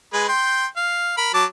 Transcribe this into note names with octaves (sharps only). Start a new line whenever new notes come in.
G#3 G#4 B4
G5 C6
F5
A#4 B5
F#3 A5 D6